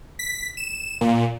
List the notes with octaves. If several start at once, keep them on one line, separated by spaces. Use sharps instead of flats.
B6
E7
A#2